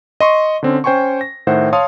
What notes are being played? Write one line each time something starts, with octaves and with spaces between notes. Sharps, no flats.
D#5 C6 C#6
D3 C4 C#4
C#4 C5 G5 G#5 C6 C#6
A#6
A2 D#3 C5 E5 F#5
C#5 F5 A5 C6 D#6